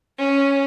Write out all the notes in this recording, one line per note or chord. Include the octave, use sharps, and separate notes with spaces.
C#4